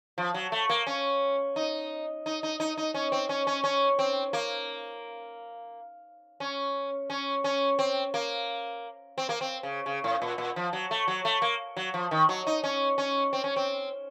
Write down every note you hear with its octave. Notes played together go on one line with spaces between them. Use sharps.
F3
F#3
A3
A#3
C#4
D#4
D#4
D#4
D#4
D#4
C#4
C4
C#4
C#4
C#4
C4
A#3
C#4
C#4
C#4
C4
A#3
C4
A#3
C4
C#3
C#3
A2
A#2
A#2
F3
F#3
A3
F#3
A3
A#3
F#3
F3
D#3
F#3
D#4
C#4
C#4
C4
C#4
C4